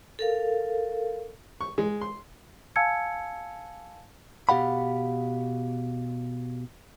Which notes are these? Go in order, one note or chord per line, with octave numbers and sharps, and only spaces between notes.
A4 A#4 F5
C#6
G#3
C6
F5 G#5 A5 E6 G#6 C#7
B2 G4 F5 F#5 B5